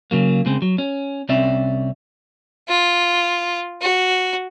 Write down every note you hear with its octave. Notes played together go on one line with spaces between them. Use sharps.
C#3 F#3 A#3
C#3 G#3 C4
F#3
C#4
C2 C4 C#4 D5 E5
F4
F#4